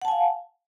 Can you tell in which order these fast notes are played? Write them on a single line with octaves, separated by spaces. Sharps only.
F#5 A5 G#5 F5